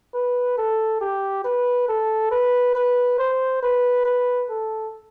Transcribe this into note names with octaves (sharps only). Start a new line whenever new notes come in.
B4
A4
G4
B4
A4
B4
B4
C5
B4
B4
A4